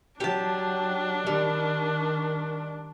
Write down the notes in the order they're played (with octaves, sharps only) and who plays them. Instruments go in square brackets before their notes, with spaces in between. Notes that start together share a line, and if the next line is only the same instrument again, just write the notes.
[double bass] F#3 [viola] D4 [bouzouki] G4 A5
[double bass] D#3 [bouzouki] G3